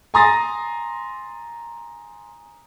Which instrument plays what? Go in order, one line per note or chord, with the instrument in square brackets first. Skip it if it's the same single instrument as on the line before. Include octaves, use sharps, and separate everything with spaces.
[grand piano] G#5 A#5 C6 D#6 A6 A#6